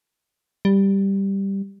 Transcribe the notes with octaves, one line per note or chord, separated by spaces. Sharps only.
G3